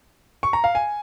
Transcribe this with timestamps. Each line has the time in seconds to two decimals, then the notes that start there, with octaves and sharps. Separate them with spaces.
0.43 C#6
0.53 A#5
0.64 F5
0.75 G#5